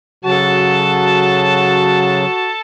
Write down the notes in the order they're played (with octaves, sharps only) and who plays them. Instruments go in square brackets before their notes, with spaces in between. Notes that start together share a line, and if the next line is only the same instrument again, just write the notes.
[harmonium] C#3 F#3 [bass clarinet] F#4 [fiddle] A4 A5